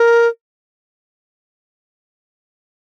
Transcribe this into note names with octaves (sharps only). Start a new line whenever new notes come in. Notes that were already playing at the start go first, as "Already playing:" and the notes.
Already playing: A#4